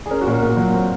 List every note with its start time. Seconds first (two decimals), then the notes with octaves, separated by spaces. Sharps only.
0.06 G#4
0.11 C#4 A#4
0.21 F#4
0.26 A#2
0.32 A#4
0.42 A#2
0.57 F#3
0.73 C4